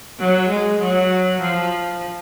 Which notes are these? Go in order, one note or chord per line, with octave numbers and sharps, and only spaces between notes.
F#3
G#3
F#3
F3